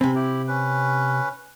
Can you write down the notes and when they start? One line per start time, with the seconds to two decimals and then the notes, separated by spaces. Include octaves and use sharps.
0.01 C3 C4 G#5 B5
0.15 E4 G4
0.48 C#4 B4